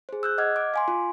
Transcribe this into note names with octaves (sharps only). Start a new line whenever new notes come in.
G#4 C5
E6 F#6 G6
D#5 F#5 D6 F6 G#6
D6
F5 G#5 C6
F4